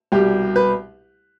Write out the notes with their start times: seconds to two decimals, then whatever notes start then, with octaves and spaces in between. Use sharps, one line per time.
0.12 C2 B2 G3 G4
0.56 B4